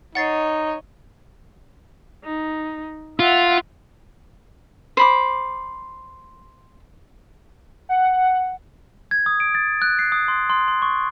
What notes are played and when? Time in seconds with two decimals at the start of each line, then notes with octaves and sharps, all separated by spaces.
0.15 D#4 C#5 D#5 F#5 A6 C7
2.24 D#4
3.20 F4 E5 F#5
4.97 C5 B5 D6
7.89 F#5
9.11 G#6
9.26 D#6
9.40 D7
9.55 A6
9.82 F#6
9.99 C7
10.12 D#6
10.28 C6
10.50 C6
10.68 C6
10.82 C#6